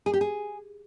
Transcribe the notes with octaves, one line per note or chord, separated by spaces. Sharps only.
G#4
G4
G#4